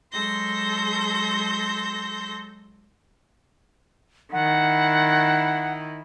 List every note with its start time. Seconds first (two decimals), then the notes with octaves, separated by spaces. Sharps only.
0.11 F#3 G#3 A4 C6 G6 A#6
4.32 D#3 E4 F#5